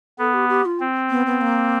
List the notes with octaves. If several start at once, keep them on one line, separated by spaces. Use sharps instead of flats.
B3 A4
G4
G4
F4
C4
B3
B3
A#3